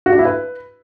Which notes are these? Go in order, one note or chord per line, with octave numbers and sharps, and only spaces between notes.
F#4
D4
E4
B4